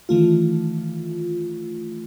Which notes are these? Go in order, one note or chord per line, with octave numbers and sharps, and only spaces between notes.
D#3 E3 A3 F4